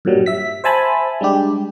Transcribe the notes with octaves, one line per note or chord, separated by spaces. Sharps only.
G2 A#2 F#3 G3
E5 B6
C5 E5 G#5 A5 B5
G3 G#3 D4 G4